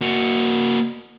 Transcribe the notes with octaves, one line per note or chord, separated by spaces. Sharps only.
A#3 F#4